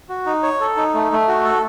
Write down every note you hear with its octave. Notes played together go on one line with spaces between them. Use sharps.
F#4
D#4
C#5
A4
D#4
A3
A3
F#4
A4